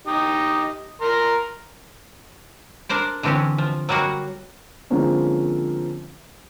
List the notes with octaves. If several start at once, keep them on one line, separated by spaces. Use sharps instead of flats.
D#4 G4 D#5
A#4 A#5 C6
D4 A#4 C5 D5
D3 E3 C4 C#4 G4
F3
F#3 G3 A#3 F#4
D3 F3 G#3 A#3 C4 C#4